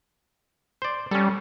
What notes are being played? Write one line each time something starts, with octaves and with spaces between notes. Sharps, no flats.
C5 D5
G3 C#4 A4